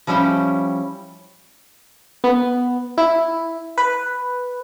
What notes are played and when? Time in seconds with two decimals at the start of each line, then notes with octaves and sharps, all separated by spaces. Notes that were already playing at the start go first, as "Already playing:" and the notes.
0.07 F3 G3 C#4 E4 G5
2.24 B3
2.98 E4
3.78 B4